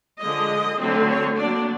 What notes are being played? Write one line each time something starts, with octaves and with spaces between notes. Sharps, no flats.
D3 F3 G#3 D#5
D3 F#3 A3 C4
C#5
F#3 A#3 D4 D5